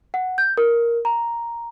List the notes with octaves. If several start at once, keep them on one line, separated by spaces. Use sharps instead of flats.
F#5
G6
A#4
A#5